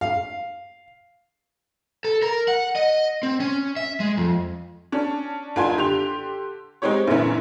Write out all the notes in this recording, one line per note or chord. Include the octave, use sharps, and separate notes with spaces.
F5
A4
A#4
F#5
D#5
C4
C#4
E5
G#3
F2
C#4 D4
F#1 D4 F4 G#5 C6
D3 G4 C6 F7
G#3 C4 D#4 G4 C#5
F#2 A#2 D3 E3 C#4 E4